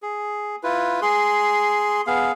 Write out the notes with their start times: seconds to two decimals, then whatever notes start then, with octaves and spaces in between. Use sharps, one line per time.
0.02 G#4
0.63 E4 F4 B4
1.02 G#4 C6
2.07 B3 G#4 F5